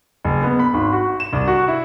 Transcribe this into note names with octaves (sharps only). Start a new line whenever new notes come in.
F#1
B3
B5
G#1
F#4
E7
C2
F#4
E4